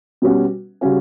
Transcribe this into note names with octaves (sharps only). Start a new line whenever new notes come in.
B2 G3 C#4 F#4
C#3 G3 C#4 F#4